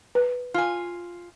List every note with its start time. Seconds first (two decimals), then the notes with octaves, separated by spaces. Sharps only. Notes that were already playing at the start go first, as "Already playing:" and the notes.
0.15 B4
0.54 F4 G#5